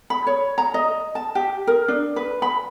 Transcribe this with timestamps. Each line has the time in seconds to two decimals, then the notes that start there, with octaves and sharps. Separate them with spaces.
0.10 B5
0.27 C#5
0.58 A#5
0.74 D#5
1.15 A5
1.35 G4
1.67 A#4
1.88 D4
2.16 B4
2.42 B5